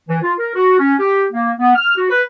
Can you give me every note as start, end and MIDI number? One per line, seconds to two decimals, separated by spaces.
0.08 0.17 52
0.22 0.32 65
0.38 0.53 70
0.55 0.77 66
0.79 0.94 61
0.99 1.24 67
1.32 1.51 58
1.58 1.74 59
1.75 1.95 89
1.96 2.08 66
2.10 2.21 71